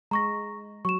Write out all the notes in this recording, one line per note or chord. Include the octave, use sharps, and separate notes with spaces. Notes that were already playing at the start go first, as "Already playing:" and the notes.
G#3 A#5 C#6 A#6
F#3 C#6 E7